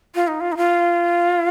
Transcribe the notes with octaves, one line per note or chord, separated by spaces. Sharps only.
F4
D#4
F4
D#4
F4